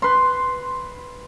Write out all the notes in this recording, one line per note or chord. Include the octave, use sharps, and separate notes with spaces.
B4 C6